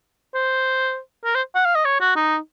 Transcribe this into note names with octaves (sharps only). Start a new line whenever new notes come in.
C5
A#4
C5
F#5
F5
D#5
C#5
F#4
D#4